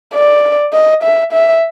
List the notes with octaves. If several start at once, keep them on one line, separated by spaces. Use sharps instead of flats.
D5
D#5
E5
E5